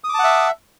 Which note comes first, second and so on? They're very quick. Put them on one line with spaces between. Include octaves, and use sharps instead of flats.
D#6 D6 A5 F#5 E5